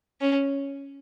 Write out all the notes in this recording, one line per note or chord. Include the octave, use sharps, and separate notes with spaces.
C#4